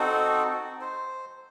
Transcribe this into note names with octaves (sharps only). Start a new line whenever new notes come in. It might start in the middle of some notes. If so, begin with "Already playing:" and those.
Already playing: C4 D#4 F#4 A4
C5